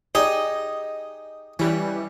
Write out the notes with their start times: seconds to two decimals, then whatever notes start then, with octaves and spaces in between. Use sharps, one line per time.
0.15 D#4 G4 G#4 D#5
1.59 E3 G3 C#4